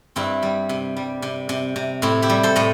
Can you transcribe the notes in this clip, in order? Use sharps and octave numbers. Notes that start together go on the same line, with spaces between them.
G2 C4 E4
G3
C3
G3
C3
C3
C3
A2 C4 E4
E4 G4
G3
A4 C5
A2 D#5